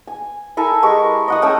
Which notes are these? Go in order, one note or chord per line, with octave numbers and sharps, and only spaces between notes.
G#5
E4 A4 A#4 G#5
G#3 G4 A#4 C#6
D#5 F#5 D#6
A3 C#4 G5